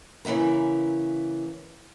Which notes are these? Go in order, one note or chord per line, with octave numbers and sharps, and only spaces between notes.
C#3 E3 A#3 E5 A#5